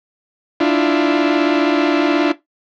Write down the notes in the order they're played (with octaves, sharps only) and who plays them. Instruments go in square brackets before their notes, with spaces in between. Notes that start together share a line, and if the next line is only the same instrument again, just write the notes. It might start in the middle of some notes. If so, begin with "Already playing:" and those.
[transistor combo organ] D4 E4 F4